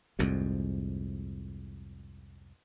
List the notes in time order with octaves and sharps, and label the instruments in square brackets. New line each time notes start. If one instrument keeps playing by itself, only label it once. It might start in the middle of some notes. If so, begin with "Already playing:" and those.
[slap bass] C2 F2 G#2